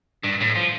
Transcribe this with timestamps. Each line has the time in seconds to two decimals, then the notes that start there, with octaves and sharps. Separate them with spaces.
0.24 G2
0.41 A2
0.56 F3